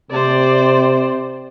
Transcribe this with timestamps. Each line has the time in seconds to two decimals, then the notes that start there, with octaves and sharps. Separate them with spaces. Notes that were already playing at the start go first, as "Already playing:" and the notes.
0.11 C3 C5 D5